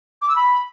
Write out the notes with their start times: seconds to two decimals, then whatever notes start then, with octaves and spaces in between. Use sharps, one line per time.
0.22 D6
0.29 E6
0.35 B5